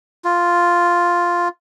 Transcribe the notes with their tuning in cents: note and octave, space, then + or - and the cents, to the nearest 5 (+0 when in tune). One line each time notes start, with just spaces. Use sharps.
F4 +0